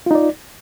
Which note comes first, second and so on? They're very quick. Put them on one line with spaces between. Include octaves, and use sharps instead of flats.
F4 D#4 D5